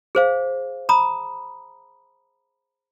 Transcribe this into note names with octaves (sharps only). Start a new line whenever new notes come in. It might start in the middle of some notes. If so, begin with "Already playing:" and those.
G#4 C5 F5
A#5 B5 D#6